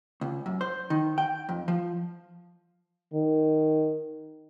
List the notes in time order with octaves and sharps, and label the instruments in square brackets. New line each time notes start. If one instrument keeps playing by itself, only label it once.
[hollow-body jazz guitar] C#2
F#2
C5
D#3
G5
F2
F3
[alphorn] D#3